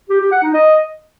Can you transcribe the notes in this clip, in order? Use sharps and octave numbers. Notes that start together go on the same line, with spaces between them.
G4
G4
F#5
D#4
D#5